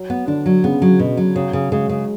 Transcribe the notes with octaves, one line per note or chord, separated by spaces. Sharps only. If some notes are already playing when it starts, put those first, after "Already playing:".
Already playing: F#3
B3
D3 D4
F#3
C#3 B3
F#3
B2
F#3
C#3 F#3
C#3
C#3 G#3
C#3